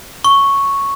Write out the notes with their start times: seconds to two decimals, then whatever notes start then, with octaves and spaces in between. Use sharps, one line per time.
0.24 C#6